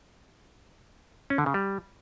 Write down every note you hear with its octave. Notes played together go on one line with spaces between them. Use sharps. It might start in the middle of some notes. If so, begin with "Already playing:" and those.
C#4
D3
C#3
G3